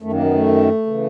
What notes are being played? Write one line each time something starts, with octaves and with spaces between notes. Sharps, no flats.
F#2 D#3 A3
A#3
B3
A3
C#3 E3